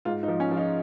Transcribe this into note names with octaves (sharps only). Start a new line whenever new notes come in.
G#2 F4
D#4
F3
C#4
F3 F4
D#4